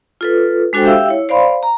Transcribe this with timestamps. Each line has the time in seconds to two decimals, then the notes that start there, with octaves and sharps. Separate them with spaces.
0.21 F4 A4 B4
0.73 G#3 D4 F#4 A4 C5 G5
0.85 G4 E5 F5 G5 E6
1.09 E4 C#5
1.29 C5 D5 F5 B5 C6
1.63 A#5